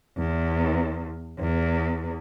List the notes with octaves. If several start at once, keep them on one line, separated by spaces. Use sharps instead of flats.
E2
E2